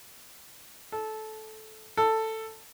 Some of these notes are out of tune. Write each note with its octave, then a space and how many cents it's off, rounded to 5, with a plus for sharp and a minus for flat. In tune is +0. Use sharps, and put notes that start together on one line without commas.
A4 -15
A4 +10